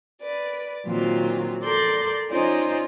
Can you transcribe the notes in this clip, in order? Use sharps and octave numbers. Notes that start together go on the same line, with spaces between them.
B4 D5
A#2 D#3 F#3 C4 F4
A4 A#4 D5 C6 G6
C#4 D#4 F4 C5 D5 D#5